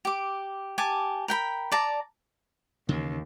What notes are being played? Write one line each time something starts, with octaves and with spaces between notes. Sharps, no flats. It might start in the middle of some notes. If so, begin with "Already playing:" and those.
G4 D6
G4 G#5 A5 D6
A#4 G5 B5
D5 A5 A#5
D#2 C#3 E3 A#3